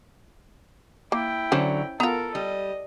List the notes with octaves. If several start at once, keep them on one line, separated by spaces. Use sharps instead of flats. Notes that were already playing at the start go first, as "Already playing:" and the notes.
A#3 E4 G5
D3 F#3 C#4 C5 A5
B3 F4 A4 A#4 A#5
G3 D#5